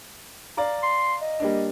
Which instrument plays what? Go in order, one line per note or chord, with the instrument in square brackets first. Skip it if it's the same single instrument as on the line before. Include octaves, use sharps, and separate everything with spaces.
[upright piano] D5 F5 A#5
[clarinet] C6
D#5
[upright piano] G3 A#3 D4